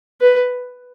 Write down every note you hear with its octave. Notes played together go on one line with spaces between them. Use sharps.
B4